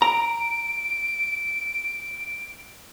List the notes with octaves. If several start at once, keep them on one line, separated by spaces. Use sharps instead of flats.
A#5 D7